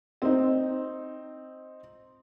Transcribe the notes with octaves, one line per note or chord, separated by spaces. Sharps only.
C4 D#4